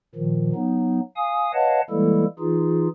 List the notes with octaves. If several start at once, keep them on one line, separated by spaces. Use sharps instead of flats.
A#2 D#3 F3
F#3 B3 D#4
F5 G#5 D#6
B4 C#5 D#5 F5 F#5 A5
E3 G3 G#3 A#3 E4 A4
E3 D#4 F4 G#4